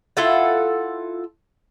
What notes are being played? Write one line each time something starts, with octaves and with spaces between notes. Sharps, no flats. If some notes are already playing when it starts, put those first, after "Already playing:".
E4 F4 A4 F#5